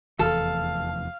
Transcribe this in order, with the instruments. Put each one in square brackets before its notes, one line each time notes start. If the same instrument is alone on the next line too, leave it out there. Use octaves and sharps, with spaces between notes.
[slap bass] F1 E2 E3 [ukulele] A4 [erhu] F5